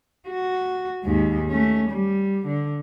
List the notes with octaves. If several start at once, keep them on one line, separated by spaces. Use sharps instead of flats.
F#4
D#2 G#2
A3 C#4
G3
D3